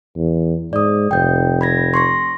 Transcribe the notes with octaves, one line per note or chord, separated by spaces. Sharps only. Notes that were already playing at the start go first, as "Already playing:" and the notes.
E2
G#2 D5 D#6
F1 G5 G6
B5 G#6 A#6
C6 C#6 A#6